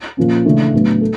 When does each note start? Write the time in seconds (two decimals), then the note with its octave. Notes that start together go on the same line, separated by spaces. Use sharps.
0.17 A#2 F3 A#3 C#4
0.45 C#3 E3 A3 D4
0.73 A2 F#3 B3 D4
1.01 A4